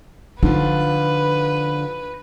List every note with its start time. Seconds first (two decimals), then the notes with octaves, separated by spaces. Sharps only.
0.43 D3 F3 D#4 F4 B4